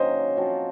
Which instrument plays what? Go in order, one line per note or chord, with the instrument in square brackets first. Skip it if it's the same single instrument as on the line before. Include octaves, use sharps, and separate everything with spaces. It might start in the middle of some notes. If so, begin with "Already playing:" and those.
Already playing: [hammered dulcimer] D#3 F#3 A#3 C#4 [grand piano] C5 D#5
[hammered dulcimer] F3 C4 F#4